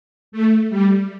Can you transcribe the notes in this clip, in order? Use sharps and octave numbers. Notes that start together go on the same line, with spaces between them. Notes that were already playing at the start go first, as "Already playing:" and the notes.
A3
G3